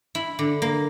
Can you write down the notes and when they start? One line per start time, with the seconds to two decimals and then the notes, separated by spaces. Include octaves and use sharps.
0.15 E4
0.39 D3
0.62 A#3